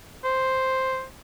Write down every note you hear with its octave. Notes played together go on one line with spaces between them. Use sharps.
C5